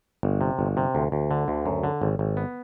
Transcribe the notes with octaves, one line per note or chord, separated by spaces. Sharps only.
G1
C3
G1
C3
D2
D2
D3
D2
F#2
D3
G#1
G#1
B3